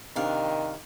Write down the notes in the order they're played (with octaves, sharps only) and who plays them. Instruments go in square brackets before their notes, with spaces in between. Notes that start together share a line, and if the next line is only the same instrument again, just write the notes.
[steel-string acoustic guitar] C3 D4 F5 [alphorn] D#3